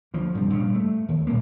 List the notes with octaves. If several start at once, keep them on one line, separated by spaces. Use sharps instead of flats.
D2 F3
G2 C3
G2 A#2 C#3
A3
D#2
A#2 G#3 A#3